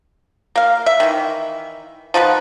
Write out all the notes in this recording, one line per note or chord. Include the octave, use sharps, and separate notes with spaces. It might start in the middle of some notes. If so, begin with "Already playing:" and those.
A#3 F5
E5
D#3 E3
F3 D#4 F#4 B4